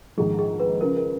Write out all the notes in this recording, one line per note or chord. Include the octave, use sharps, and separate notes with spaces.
A#1 G#2 D#3 G#4
G#4
B4
C#3 F3 G#3 A#4
A#4